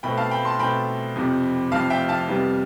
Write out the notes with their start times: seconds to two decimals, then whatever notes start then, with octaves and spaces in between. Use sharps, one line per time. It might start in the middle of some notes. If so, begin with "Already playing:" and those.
0.03 B2 A3 C4 G5 B5
0.17 F5 A5
0.31 G5 B5
0.45 A5 C6
0.59 B2 A3 C4 G5 B5
1.16 F2 C3 F3
1.71 F2 C3 F3 F5 A5
1.90 E5 G5
2.09 F5 A5
2.28 F2 C3 G3 B3